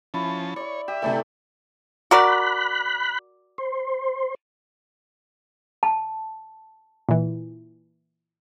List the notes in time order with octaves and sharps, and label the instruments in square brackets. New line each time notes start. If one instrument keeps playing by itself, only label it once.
[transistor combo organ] F3 C#4 A5 [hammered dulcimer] E4
[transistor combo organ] C#5 [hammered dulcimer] D5 C#6
[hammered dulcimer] G4 [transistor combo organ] E5
[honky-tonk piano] C3 A3 E4 [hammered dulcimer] E3 A4 D5
[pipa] F#4 A#4 D5 [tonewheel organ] B5 F#6
[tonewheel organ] C5
[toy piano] A5
[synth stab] A#2 E3